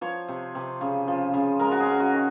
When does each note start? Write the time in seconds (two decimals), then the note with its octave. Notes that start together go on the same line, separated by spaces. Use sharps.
0.01 F3 C#5
0.28 C3
0.55 C3
0.81 C#3
1.08 F3
1.34 C#3
1.59 G#3 A#4
1.72 F#4
1.80 G#4
1.87 C#4
2.00 F#4
2.13 D#3